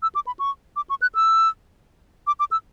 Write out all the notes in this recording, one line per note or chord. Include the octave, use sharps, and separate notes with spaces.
E6
D6
B5
C#6
D6
C#6
F#6
E6
D6
D6
E6